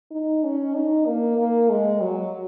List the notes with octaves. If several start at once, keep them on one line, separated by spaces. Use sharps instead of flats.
D#4
C#4
D#4
A#3
A#3
G#3
F#3